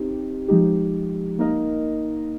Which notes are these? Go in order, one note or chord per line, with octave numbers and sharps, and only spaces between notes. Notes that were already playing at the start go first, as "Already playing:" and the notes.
Already playing: C4 D#4 G4
F3 G#3 D#4 G4
A#3 D#4 A#4 D#5